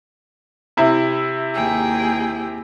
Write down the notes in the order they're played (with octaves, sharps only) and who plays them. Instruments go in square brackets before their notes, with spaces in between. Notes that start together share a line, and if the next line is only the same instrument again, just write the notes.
[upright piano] C3 E4
[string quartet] D#2 G#4 G5